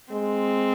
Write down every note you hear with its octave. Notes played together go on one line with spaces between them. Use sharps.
G#3 C4